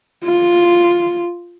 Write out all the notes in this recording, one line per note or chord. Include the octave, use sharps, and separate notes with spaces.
F4